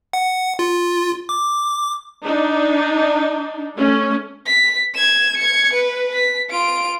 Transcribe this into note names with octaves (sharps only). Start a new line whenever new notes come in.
F#5
F4
D6
D4 D#4
A3 C#4
B6
G#6 E7
G#6 C#7
B4
B6
F4 D7